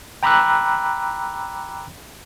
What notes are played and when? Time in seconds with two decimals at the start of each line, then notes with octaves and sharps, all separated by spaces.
0.23 G5 A#5 B5 D6 E6 F#6